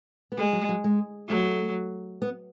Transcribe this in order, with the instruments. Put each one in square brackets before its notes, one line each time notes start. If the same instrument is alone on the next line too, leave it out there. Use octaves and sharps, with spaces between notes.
[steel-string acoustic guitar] B3
[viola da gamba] G#3 [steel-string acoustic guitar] A3
[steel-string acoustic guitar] F#3
F#3
G#3
[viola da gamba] F#3 [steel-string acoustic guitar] A3
[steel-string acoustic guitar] B3